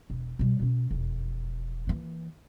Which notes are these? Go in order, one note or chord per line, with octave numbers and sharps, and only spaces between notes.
E1
B2 G3
B2 C#4
E1 F2
E3 A#3